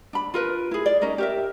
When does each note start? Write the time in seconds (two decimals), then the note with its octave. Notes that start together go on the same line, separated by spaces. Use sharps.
0.13 D4 B5
0.34 F4 A#4 B4
0.71 E4 G#4
0.86 D5
1.01 C#4 D#4 A#4 D#5
1.18 G4 A#4 E5